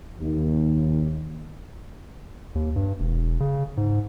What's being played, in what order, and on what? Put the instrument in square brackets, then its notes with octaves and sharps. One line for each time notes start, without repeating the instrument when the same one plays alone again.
[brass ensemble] D#2
[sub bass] D#2
G2
E1
C#3
G#2